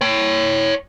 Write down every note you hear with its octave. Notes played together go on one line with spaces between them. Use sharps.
C#5 G5